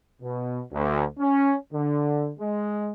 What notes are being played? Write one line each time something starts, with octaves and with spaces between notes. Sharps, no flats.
B2
D2
C#4
D3
G#3